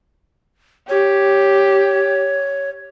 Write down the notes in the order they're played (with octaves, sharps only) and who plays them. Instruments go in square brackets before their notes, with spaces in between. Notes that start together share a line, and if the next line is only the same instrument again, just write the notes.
[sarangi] G4 [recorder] C#5